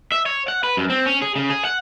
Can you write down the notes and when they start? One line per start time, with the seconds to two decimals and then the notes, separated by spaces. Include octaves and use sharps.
0.12 E5
0.26 C#5
0.48 F#5
0.64 B4
0.77 F#2
0.90 C4
1.06 C#4
1.22 G#4
1.36 C#3
1.50 G#4
1.65 F#5